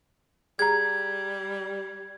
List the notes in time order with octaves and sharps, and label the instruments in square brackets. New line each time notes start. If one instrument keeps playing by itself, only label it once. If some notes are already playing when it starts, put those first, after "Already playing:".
[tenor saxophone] G3 [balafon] G#4 A#5 [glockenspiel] G#6